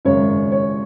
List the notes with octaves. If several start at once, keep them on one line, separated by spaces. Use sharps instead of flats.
G#1 F#2 C#3 C#5
C#5